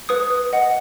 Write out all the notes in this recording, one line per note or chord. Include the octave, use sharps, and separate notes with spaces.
B4 D#6
D#5 F#5